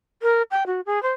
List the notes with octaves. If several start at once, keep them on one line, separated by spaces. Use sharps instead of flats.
A#4
G5
F#4
G#4
C5